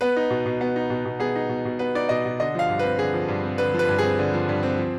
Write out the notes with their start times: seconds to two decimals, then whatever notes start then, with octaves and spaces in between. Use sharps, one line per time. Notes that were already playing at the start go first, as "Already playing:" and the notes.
0.01 B3 B4
0.17 D#4
0.30 B2
0.46 B2
0.61 B3
0.76 D#4
0.90 B2
1.05 B2
1.20 B3 G#4
1.36 D#4
1.49 B2
1.65 B2
1.79 B3 B4
1.95 D#4 D5
2.09 B2 D#5
2.25 B2
2.40 D3 D#5
2.55 F3 F5
2.69 G2
2.79 C4 B4
2.99 D3 G#4
3.14 F3
3.28 G2
3.43 C4
3.58 D3 B4
3.74 F3
3.79 B4
3.89 G2
3.99 C4 G#4
4.19 D3
4.34 F3
4.49 G2
4.63 C4
4.78 F3